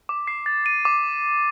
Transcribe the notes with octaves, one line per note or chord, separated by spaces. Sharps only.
D6
C7
A6
D#7
D6